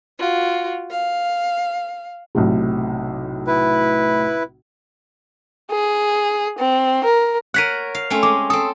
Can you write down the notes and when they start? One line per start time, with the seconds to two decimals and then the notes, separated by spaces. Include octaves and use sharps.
0.19 F4 F#4
0.90 F5
2.35 B1 A2 C3
3.47 E4 B4
5.71 G#4
6.58 C4
7.04 A#4
7.54 A#4 C#5 F#5 F#6 B6 D#7
7.95 F5
8.10 A3 C4 C#4
8.23 G#3 D6
8.50 C4 A4 D#6